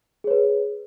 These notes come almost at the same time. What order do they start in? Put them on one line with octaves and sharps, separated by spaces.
G#4 C#5 B4